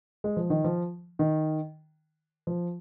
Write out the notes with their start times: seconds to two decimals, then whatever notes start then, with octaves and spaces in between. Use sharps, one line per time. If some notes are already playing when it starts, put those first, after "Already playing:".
0.24 G#3
0.37 F3
0.50 D#3
0.64 F3
1.19 D#3
2.47 F3